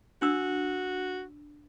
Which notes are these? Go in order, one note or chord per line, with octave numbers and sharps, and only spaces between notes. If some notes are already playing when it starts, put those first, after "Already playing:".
D4 F#4 E6